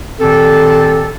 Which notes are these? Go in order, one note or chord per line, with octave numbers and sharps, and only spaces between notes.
A#2 D#3 C4 G4 A4